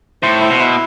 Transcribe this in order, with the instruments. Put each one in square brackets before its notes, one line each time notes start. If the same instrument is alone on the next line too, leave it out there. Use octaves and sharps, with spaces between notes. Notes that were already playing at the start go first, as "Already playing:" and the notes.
[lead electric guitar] A2 [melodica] C5
[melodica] E4
[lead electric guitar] B2
[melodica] E4